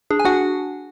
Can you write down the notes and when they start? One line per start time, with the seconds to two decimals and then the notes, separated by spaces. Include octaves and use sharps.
0.10 D4 G#4
0.19 G#5
0.25 D4 F#4 F#5